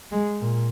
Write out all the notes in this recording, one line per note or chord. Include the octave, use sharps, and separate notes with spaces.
G#3
A#2